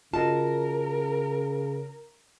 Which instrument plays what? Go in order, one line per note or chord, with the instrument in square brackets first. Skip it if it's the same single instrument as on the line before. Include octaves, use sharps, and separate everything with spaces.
[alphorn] C#3 [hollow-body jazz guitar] F4 F#4 D#5 [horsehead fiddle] A#4 [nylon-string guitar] A5